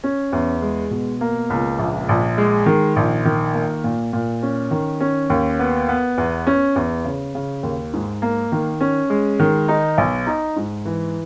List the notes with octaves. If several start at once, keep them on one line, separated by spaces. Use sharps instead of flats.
C#4
E2
G#3
B2
A#3
C#2
A#1
A#1
G#3
D#3
A#1
D#3
A#3
A#2
A#2
C#4
D#3
C#4
D#2
B3
B3
E2
C#4
E2
C#3
C#3
D#2
G#2
A#3
D#3
C#4
G#3
D#3
D#4
B1
D#4
G#2
E3